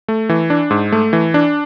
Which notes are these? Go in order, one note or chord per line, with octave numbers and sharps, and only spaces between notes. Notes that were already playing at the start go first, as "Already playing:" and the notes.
A3
E3
D4
G#2
A3
E3
D4